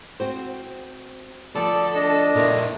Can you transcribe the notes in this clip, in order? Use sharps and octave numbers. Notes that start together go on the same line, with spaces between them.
C4 F#4 C5
D2 F3 B3 A4 D5
D4 D#5
A#2 E4 A4 A#4 F5